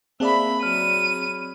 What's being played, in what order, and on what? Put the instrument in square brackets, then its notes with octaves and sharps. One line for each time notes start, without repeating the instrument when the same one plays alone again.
[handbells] A#3 A5 F#6 [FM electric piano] C4 G#4 D5 [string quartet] E5 B5
[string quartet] F#3 [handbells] B5 F6 [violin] D#7